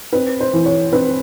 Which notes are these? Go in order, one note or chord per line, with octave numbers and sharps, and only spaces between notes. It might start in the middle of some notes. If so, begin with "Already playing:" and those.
C4 B4
C5
E3
C#5
C4 B4